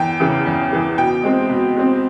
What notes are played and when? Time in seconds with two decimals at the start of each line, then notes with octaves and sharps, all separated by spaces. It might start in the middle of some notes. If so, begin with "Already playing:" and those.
Already playing: E2 G5
0.20 C#3 E3
0.46 E2
0.71 C#3 E3
0.97 B2 G5
1.24 G#3 C4
1.49 B2
1.76 G#3 C4